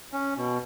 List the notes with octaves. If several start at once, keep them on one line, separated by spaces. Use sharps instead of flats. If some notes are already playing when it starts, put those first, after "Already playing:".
C#4
B2